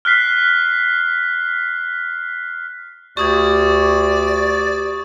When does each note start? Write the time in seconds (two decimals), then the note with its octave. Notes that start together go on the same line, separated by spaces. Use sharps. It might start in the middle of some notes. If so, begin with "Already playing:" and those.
0.05 F6 F#6 B6 C7
3.17 D2 G4 D5 C#6 D#6 G#6